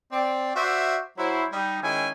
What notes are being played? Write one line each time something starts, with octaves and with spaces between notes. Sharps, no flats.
C4 D5
F#4 C5 D5 E5
F#3 E4 C5
G3 D#4
D#3 G#3 C#4 D#4 E4 G#5